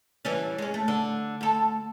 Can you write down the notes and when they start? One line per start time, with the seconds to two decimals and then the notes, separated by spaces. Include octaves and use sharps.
0.25 E3 G3 C#4
0.58 G#3 C#4
0.74 A3
0.88 D3
1.41 D2 A4